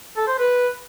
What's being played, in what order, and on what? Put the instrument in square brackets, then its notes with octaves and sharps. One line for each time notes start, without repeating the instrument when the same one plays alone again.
[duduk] A4
C5
B4